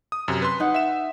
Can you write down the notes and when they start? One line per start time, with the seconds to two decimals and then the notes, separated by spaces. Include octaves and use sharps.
0.12 D#6
0.28 F#2 C3
0.42 B4 C6
0.60 D#4 F#5
0.74 E5 E7